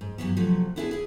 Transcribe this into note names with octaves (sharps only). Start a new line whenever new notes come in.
G#2
G2 E3 F#3 B3
C3 F3 F#3 A3
B3 D4 E4 G#4 G5 A5
G#4 E5